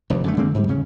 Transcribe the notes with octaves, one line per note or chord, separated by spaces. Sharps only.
F1 D#2
F#2 D3 A3
D3 G#3 A#3 C4
G#2 G3
F2 C#3 C#4